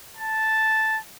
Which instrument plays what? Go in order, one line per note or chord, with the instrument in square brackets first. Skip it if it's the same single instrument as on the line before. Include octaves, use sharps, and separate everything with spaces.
[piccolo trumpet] A5